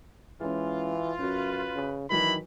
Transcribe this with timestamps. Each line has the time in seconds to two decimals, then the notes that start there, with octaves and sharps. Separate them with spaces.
0.40 E3 G#3 C#4 F4
1.19 F#2 C#4 F#4 B4
1.75 C#3
2.10 D#3 E3 F#3 C4 D4 E4 B4 B5